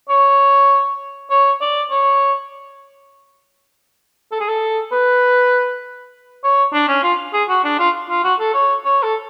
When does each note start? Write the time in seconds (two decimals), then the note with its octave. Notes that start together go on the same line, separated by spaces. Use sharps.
0.09 C#5
1.30 C#5
1.61 D5
1.91 C#5
4.32 A4
4.40 G#4
4.48 A4
4.92 B4
6.44 C#5
6.73 D4
6.88 C#4
7.03 F4
7.33 G#4
7.49 F#4
7.64 D4
7.79 F4
8.09 F4
8.24 F#4
8.40 A4
8.54 C#5
8.85 C#5
9.03 A4